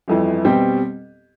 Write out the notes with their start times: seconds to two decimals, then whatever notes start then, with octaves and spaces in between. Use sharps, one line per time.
0.08 G1 F2 E3
0.45 B2 G3 C4 G4